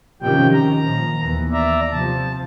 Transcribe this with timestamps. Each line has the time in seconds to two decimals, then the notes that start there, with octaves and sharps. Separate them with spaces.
0.22 C3 D#3 F3 C#4 G4 G5
0.52 A#5
0.84 A#2 D#3 F3
1.20 D#2 E3 B3
1.52 D5 E5 A#5
1.91 C3 F3 A5